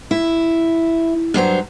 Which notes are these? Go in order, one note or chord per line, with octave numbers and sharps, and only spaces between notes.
E4
G2 F#3 C5 A#5